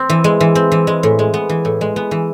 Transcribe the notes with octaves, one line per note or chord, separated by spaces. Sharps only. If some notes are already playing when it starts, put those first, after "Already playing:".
Already playing: C4
E3
G#3
E3
C4
E3
G#3
A2
G#3
B3
E3
A2
G#3
B3
E3